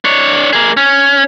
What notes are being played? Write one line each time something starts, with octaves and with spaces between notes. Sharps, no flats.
D4 C#5
A#3 G#4
C#4